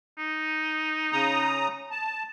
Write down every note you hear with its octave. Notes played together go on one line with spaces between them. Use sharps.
D#4
C#3 A#5 D#6
A5